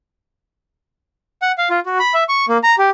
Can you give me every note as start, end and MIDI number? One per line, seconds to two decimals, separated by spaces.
1.42 1.52 78
1.58 1.69 77
1.70 1.80 65
1.86 1.98 66
1.99 2.14 83
2.14 2.24 76
2.29 2.46 85
2.48 2.58 58
2.63 2.75 82
2.78 2.90 67